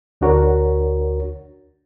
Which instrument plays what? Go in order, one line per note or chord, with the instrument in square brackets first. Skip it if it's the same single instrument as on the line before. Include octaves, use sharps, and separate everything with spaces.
[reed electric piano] D2 D4 F#4 A#4 C#5